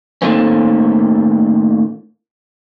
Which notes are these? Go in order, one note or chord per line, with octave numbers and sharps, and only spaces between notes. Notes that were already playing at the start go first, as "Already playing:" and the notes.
A2 D#3 A3 A#3 C4 C#4